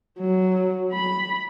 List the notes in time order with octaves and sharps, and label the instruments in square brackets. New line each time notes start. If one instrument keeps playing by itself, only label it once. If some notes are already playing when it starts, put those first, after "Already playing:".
[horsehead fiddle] F#3
B5